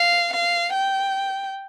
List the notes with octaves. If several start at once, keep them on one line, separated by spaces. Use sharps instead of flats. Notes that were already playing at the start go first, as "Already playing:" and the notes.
Already playing: F5
F5
G5